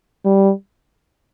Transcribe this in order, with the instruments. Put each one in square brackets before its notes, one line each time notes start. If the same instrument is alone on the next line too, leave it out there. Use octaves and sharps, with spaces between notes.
[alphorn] G3